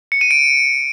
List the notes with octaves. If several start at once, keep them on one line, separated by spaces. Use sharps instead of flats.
C#7
D#7
D7